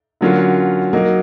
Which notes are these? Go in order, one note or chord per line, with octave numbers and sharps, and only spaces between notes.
D3 F#3 A#3 C#4 F4
F#3 A#3 D#4